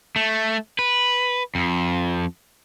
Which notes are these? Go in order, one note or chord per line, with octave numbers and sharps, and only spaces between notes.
A3
B4
F2